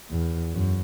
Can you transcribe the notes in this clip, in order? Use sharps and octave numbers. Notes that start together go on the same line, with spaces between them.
E2
F#2